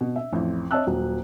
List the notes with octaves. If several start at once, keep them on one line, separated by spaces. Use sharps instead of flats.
B2
E5
A1 F2
C#5 D#5 E5 A5 E6 F#6
D#1 F#3